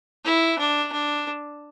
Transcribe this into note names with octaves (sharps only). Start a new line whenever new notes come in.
E4
D4
D4